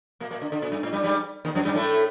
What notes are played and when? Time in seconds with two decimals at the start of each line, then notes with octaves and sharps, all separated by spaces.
0.20 A#2 A#3
0.31 A#2 A#3
0.42 D3
0.52 D3
0.62 A#2
0.72 G2
0.83 A2
0.93 G2 G3
1.03 G2 G3
1.45 D#2 D#3
1.55 F#2 F#3
1.65 G2 G3
1.75 A2 A3